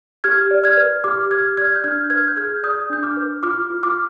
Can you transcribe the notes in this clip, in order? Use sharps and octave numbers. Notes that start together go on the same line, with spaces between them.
G4 F6 G#6
D5
F6 G#6
B4
G4 D6 F6
G4 F6 G#6
D5 F6 G#6
G6
D4 F6 G#6
B4 F6 G#6
G6
G#4 F6 G#6
D5 D#6 G6
D4 G6
D6 F6
B4
F4 D6 F6
F4
D6 F6